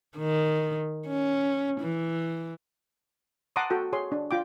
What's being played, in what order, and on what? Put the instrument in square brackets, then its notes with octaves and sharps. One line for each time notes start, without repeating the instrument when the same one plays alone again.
[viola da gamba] D#3
C#4
E3
[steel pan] F#5 A5 A#5 C6 D6 D#6
F#4 A4 G5
G#4 C#5 C6
D4
F4 G5 D6